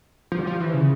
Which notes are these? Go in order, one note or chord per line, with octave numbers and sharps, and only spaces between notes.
F3
G3
F3
E3
C#3